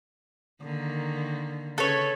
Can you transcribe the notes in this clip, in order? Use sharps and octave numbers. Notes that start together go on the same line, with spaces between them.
D3 D#3 A#3
C#3 A4 B4 C#5